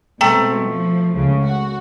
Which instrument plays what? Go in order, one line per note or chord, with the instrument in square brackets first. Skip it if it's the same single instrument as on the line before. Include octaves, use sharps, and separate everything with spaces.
[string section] B2 G#3 C4 [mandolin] A3 [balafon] G5 A#5
[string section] F3
C#2 C#3
F#4